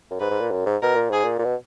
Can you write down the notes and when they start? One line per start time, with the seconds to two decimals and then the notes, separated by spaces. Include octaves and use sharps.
0.11 F#2
0.20 G#2 B4
0.30 G#2
0.41 A#2
0.51 F#2
0.66 G#2
0.82 B2 A#4
0.96 A#2
1.10 G#2 G#4
1.24 A#2
1.39 A#2
1.44 B2